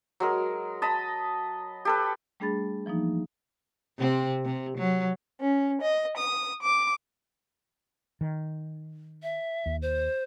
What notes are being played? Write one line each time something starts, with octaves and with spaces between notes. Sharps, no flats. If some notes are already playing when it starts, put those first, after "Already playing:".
F#3 G#3 A#4
D#5 A5 B5
G4 A4 B4
G3 A3 D4 G#4 B5 A6
E3 F3 A#3 D#4
C3 C4
C3
F#3
C#4
D#5
D#6
D6
D#3
E5
D#2
C5